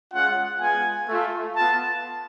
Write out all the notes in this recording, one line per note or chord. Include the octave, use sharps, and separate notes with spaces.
G#3 C#4 F4 F#5
G#3 B3 F4 G#5
A3 F4
B3 F4 A5